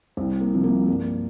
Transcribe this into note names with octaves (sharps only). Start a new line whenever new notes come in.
C2 C4
A#3
C3 F3
A#3
G2 A#3